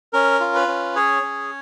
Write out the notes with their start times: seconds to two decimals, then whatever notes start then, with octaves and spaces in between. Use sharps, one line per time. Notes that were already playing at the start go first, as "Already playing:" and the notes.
0.13 C#4 A#4
0.40 F4
0.55 B4
0.68 C#4
0.95 G#4 C#5
1.23 C#4